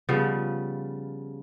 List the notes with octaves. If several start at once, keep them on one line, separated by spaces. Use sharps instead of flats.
C#3 F3 G3 B3